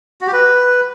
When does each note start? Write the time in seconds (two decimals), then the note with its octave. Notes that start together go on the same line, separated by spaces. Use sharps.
0.21 F#4
0.27 G4
0.33 B4